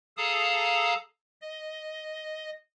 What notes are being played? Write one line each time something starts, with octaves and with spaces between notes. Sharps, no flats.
G#4 A4 F5 A5 A#5 D#6
D#5